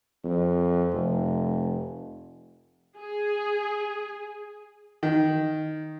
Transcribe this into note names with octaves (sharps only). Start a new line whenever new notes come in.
F2
F1
G#4
D#3